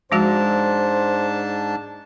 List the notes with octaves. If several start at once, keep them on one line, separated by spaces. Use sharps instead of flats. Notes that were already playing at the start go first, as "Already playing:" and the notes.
G#2 F3 G#3 D4 F#4 C5 A5